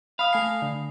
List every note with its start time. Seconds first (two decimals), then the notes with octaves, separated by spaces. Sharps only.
0.19 F5 B5 D#6
0.33 A3 G#5 C7
0.62 D3